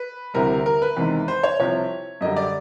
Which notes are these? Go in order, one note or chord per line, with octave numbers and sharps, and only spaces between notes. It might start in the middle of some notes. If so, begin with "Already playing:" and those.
Already playing: B4
D2 C3 E3 G3 A#4
A#4
B4
E2 C3 D#3 G#3
C5
C#5
C2 C3 F3 C#5
F#2 D3 G3 D#5
D5